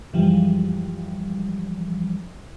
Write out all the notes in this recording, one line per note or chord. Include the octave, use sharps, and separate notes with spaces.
F#2 E3 F3 G3 G#3